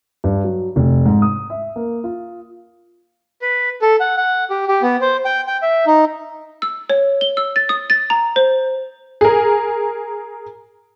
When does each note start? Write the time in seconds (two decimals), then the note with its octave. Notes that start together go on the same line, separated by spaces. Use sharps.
0.24 G2
0.45 F#3
0.76 F1
1.06 G#2
1.22 D#6
1.50 E5
1.76 A#3
2.04 F4
3.42 B4
3.82 A4
4.00 F#5
4.17 F#5
4.50 G4
4.68 G4
4.82 B3
5.01 C5
5.25 G5
5.47 G5
5.62 E5
5.86 D#4
6.62 E6
6.90 C#5
7.21 G7
7.37 E6
7.56 A6
7.69 D#6
7.90 A6
8.10 A#5
8.36 C5
9.21 G#4 A#4